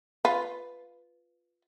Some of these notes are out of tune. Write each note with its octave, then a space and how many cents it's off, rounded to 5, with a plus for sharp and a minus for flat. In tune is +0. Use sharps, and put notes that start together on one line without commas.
F4 +0 B4 +5